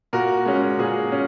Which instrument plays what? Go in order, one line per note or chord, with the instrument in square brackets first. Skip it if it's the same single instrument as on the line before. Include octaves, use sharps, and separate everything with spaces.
[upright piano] A#2 [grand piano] F#4 A#4
[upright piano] G#3 C#4
[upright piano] A#2 [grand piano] G#4
[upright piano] C#4